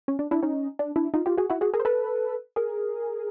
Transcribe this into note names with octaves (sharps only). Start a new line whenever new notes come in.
C#4
D4
D4 E4
C#4 D#4
D4
D4 E4
D#4 F4
F4 G4
F#4 G#4
E4 F#4
F#4 G#4
G#4 A#4
C5
A4 B4
G#4 A#4